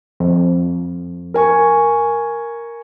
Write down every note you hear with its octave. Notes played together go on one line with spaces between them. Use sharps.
F2
A#4 G#5 C#6